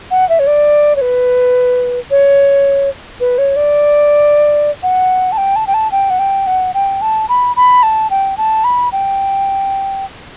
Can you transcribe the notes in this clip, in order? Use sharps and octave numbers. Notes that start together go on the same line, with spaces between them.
F#5
E5
C#5
D5
C#5
B4
C#5
B4
C#5
D5
F#5
A5
G5
A5
G5
A5
G5
F#5
G5
F#5
G5
A5
B5
B5
A5
G5
A5
B5
G5